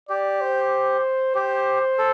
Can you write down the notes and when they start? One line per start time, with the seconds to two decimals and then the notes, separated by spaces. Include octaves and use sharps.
0.09 G4 D5
0.41 C5
1.35 G4 C5
1.98 A4